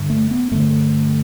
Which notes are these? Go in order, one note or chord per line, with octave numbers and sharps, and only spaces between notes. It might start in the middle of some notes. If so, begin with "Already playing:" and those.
Already playing: G2 D3
A3
B3
G2 D3 A3